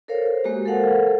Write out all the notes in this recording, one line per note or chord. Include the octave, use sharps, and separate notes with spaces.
A4 A#4 C5 C#5 F5
C5
G#3 A#3 F#4 G4
A4 A#4 C5 F5 F#5 A5